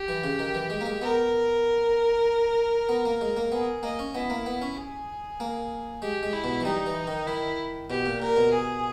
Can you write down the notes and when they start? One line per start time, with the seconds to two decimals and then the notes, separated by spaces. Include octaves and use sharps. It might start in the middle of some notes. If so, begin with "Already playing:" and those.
Already playing: G4
0.08 E3
0.24 C#3
0.39 D#3
0.54 E3
0.70 G#3
0.81 A#3
0.86 G#3
1.01 B3 A#4
2.89 B3
3.05 A#3
3.21 G#3
3.37 A#3
3.52 B3 G#4
3.83 A#3 D#5
3.99 C#4
4.15 B3 E4
4.30 A#3
4.46 B3
4.62 C#4
4.77 G#4
5.40 A#3
6.02 G#3 G4
6.23 G#3
6.33 E4
6.44 B2
6.61 E3
6.65 G3 D#4
6.86 E3
7.07 D#3
7.27 D#3 E4
7.90 B2 G4
8.06 A#2
8.21 A#2 A#4
8.37 B2
8.52 G#4